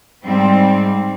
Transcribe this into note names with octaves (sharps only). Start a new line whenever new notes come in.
G#2 G3 C4